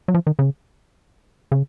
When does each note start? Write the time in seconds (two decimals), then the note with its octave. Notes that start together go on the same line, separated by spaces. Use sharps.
0.08 F#3
0.14 F3
0.27 D#3
0.39 C#3
1.52 C#3